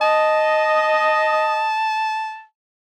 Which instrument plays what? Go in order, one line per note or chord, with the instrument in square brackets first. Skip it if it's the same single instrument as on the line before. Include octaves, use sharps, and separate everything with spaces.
[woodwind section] D#5 [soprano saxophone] A5